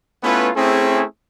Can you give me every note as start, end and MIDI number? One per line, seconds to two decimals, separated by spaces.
0.23 0.49 57
0.23 0.49 59
0.23 0.49 61
0.23 0.49 64
0.23 0.49 65
0.23 0.49 71
0.55 1.04 57
0.55 1.04 60
0.55 1.04 61
0.55 1.04 64
0.55 1.04 68